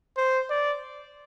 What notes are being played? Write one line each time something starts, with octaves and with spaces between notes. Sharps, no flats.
C5
D5